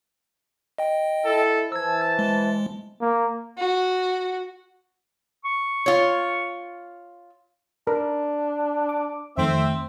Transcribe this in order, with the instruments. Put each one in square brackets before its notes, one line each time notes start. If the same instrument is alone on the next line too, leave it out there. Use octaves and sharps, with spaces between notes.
[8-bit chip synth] D#5 G5
[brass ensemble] E4 A4
[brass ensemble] E3 C5 A5 [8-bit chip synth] E6 G#6
[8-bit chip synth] G#3
[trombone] A#3
[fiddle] F#4
[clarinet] C#6
[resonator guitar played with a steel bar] F4 C#5
[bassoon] D4 [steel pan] A#4
[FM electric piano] D6
[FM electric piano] F2 D#3 A3 [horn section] C4 E5